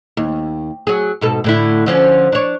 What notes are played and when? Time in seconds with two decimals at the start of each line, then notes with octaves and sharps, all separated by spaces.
0.17 D#2
0.87 F#3 G#4
1.21 G#2 B2 A4
1.44 A2 D3 E4
1.86 D3 F3 C#4
2.32 D4 C#5